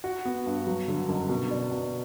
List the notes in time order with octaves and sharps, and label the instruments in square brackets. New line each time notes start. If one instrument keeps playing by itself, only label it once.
[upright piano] F#4
B3
G2
F#3
D3
F#1
B2
D4
B2